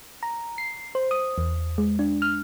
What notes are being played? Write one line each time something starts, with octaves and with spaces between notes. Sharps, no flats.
A#5
C7
C5
D#6
E2
G#3
D4
F6